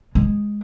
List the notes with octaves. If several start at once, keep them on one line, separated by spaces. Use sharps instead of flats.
G#3